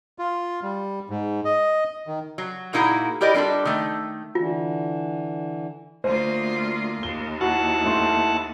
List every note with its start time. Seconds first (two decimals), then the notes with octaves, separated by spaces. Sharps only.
0.19 F4
0.63 G3
1.10 G#2
1.45 D#5
2.07 D#3
2.38 F#3
2.73 A#2 A#3 D#4 E4 F#4 G#4
3.21 E4 G4 A#4 D5 D#5
3.34 G3 D4 F4 A4
3.65 D#3 A3
4.35 D3 E3 F4
6.04 D2 A#3 F4 C5
7.03 D#2 G7
7.41 E4 F#4 F#5 A5
7.85 A3 C6